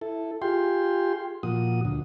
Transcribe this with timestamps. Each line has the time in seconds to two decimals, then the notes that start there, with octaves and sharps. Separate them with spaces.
0.01 E4 A4
0.42 F4 G4 G#4 G5 C6
1.43 A#2 F3 F#4 D#6
1.85 D2